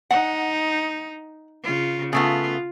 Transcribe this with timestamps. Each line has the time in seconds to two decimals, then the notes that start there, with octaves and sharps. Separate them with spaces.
0.11 D#4 F#5
1.63 C#3 F4
2.13 C#3 A3 B3 F4